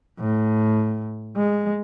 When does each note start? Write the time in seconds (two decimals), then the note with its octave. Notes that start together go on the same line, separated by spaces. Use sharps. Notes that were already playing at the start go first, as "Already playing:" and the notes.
0.19 A2
1.36 G#3